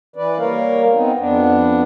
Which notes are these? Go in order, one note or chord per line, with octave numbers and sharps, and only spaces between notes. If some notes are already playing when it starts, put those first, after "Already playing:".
E3 B4 D5
G3 A#3 A#4 C#5 F5
B3 C4 D#4
F2 B3 D4